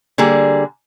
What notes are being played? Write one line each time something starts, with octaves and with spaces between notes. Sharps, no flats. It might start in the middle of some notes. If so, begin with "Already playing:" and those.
D3 G3 A#3 G#4